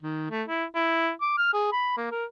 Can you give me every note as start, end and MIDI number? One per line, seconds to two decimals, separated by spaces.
0.03 0.27 51
0.31 0.43 57
0.48 0.64 64
0.75 1.10 64
1.22 1.36 86
1.38 1.52 89
1.54 1.68 68
1.73 1.93 83
1.97 2.07 58
2.11 2.25 70